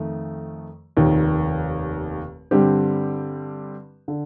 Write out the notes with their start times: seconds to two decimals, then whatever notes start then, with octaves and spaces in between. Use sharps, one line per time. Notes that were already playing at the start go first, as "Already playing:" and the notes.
Already playing: F2 D#3 A3
0.97 F1 D#2 D#3
2.51 G2 D3 G3 C4 G4
4.08 D3